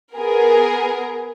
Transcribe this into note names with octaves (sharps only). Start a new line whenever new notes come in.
B3 G#4 A#4